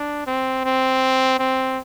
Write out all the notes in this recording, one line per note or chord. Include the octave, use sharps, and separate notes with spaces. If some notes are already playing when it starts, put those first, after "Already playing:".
Already playing: D4
C4
C4
C4